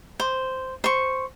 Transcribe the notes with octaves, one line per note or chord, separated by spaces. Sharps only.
C5
C5 C#6